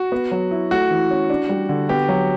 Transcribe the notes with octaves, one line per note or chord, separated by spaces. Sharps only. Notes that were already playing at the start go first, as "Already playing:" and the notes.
Already playing: F#4
B3
F#3
E4
A3 F#4
E3
C#4
D4
G3
D3
B3 G4
F#3